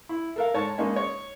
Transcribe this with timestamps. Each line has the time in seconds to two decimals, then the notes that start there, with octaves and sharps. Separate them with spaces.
0.09 E4
0.36 A4 A#4 F5
0.54 G#2 C#5 A5
0.78 G#3 A#3 C#4 D#4
0.96 C#5